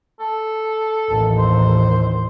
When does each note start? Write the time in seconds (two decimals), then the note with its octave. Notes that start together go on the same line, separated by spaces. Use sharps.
0.20 A4
1.09 A1 D#2
1.38 C5